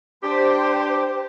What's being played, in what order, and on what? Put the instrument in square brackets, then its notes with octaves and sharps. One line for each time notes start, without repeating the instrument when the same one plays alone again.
[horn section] D4 G4 [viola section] C5 G5